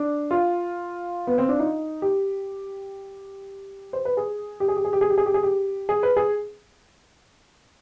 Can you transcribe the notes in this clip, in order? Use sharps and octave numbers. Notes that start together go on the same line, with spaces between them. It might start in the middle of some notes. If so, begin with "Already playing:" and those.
Already playing: D4
F4
B3
C4
D4
D#4
G4
C5
B4
G#4
G4
G#4
G4
G#4
G4
G#4
G4
G#4
G4
G#4
G4
G#4
B4
G#4